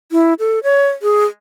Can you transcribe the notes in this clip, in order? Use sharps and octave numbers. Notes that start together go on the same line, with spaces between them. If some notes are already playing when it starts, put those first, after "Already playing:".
E4
A4
C#5
G#4